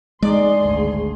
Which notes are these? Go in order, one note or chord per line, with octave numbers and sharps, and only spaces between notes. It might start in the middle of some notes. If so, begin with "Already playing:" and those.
G#3 D#4 G#4 D5 C6
G#1 D2